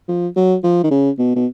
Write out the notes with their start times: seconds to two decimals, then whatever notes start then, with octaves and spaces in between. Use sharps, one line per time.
0.08 F3
0.36 F#3
0.64 F3
0.84 D#3
0.91 C#3
1.18 B2
1.36 B2